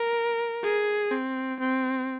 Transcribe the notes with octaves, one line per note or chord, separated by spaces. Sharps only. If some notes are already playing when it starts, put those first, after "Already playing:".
Already playing: A#4
G#4
C4
C4